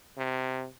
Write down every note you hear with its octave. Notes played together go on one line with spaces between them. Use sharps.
C3